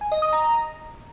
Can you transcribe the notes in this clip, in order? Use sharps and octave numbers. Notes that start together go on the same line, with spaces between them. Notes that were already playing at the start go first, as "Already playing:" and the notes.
G#5
D#5
D#6
A#5